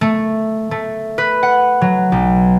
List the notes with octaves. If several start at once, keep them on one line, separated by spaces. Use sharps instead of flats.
A3
A3
B4
F#5
F#3
B1